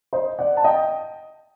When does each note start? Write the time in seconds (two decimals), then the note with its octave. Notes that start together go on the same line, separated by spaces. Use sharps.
0.13 C5 D#5
0.39 D5 F#5
0.57 A5
0.64 D#5 G5